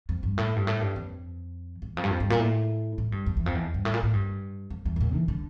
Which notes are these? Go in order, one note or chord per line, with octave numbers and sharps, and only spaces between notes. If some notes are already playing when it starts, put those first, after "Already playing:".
F2
G2
A2
G2
A2
G2
F2
E2
F2
G2
F2
G2
A#2
A2
A2
G2
F2
E2
F2
E2
G2
A2
A#2
A2
G2
F2
E2
A2
A#2
E3
D3